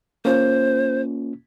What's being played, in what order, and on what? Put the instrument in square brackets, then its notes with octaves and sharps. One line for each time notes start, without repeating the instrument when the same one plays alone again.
[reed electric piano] A#3 C#4 F4 [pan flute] C5